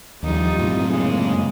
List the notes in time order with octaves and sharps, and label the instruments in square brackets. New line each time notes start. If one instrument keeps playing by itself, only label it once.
[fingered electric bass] D#2 F3 [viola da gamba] G3 D#4 F4
[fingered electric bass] F#2 A2 C3
[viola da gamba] C#3 G#3 A#3